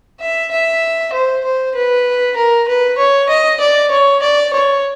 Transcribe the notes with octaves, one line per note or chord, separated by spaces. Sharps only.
E5
E5
C5
C5
B4
A#4
B4
C#5
D#5
D5
C#5
D5
C#5